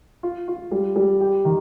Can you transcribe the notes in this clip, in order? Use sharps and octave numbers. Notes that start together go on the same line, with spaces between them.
F4
F4
G3
G3
G4
D#3